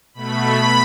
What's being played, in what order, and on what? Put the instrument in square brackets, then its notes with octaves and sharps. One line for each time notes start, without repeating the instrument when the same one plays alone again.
[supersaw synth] B2 A3 B5